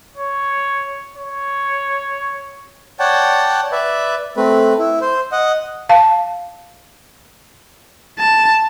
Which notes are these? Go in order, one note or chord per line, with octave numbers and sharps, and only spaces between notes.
C#5
C#5
C#5 D5 F#5 G5 A5
B4 D5 E5
A3 C4 B4
E4
C5
D#5 F#5
F5 A5
A5